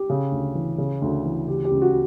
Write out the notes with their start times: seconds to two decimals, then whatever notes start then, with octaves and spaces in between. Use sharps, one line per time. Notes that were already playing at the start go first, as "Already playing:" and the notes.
Already playing: G4
0.09 C#3
0.31 D2
0.55 E3
0.78 C#3
1.02 D2
1.25 E3
1.47 C#3 G4
1.65 G4
1.71 C#2
1.82 F#4